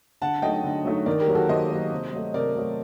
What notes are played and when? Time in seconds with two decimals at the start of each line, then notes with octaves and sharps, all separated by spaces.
0.21 D3 F#5 A5
0.42 F#3 A3 D#4 D#5 G5
0.64 D3
0.85 F#3 A3 D#4
1.06 D#3 A#4 D5
1.20 G4 A#4
1.27 F#3 A#3
1.35 F#4 A4
1.49 D#3 C5 D#5
1.70 F#3 A#3
1.92 C3
2.13 F#3 A3
2.34 C3 A#4 D5
2.55 F#3 A3